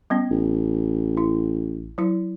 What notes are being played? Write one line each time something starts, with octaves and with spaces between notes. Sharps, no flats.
G3 B3 C#4
A1
E4
F#3 E4